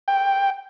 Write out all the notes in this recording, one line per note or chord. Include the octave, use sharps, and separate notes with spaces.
G5